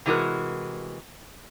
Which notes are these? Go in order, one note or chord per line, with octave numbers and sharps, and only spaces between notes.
C3 E3 G#3 F#4 A#4